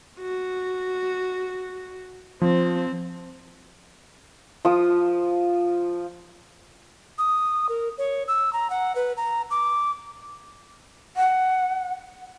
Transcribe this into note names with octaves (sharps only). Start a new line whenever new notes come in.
F#4
F3 C4
F3 D#6
D#6
A#4
C#5
E6
A#5
F#5
B4
A#5
D6
F#5